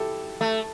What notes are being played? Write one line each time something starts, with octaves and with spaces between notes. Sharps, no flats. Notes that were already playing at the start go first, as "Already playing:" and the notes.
Already playing: E4 G4 A4
A3